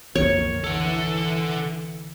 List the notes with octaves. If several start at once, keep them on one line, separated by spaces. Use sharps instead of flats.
B1 F2 D3 A#3 C#5
E3 A4 F#5